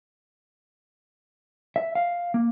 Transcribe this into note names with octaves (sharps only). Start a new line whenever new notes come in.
E5
F5
A#3